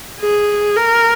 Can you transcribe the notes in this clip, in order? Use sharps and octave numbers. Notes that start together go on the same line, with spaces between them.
G#4
A#4